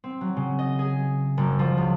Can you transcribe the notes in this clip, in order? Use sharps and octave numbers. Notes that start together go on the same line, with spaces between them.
C4
F#3
C#3
D#5
G#4
F#1
F3
C#2